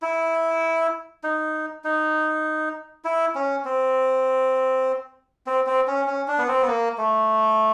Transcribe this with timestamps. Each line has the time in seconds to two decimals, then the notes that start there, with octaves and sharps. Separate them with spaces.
0.02 E4
1.23 D#4
1.84 D#4
3.05 E4
3.35 C#4
3.65 C4
5.46 C4
5.66 C4
5.87 C#4
6.08 C#4
6.28 D4
6.38 B3
6.48 C4
6.62 B3
6.68 A#3
6.98 A3